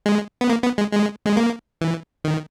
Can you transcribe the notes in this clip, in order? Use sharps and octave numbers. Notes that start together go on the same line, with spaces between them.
G#3
B3
A#3
B3
G#3
G#3
G#3
A#3
E3
D#3